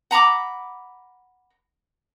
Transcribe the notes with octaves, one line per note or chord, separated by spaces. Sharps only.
F#5 A#5 B5 D6